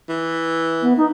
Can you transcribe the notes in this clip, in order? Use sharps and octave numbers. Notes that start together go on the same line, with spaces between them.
E3
B3
D#4